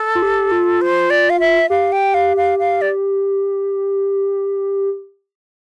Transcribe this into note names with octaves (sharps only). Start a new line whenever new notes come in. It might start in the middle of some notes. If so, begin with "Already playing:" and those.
Already playing: A4
F4
G4
F4
C5
D5
F5
E5
G4 F5
G5
F5
F5
F5
D5